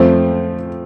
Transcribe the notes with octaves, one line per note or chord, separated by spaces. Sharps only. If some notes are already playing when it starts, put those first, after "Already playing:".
Already playing: F2 F3 A3 C4 C5